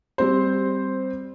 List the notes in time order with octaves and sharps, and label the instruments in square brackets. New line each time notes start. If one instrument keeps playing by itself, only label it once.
[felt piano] G3 C4 C5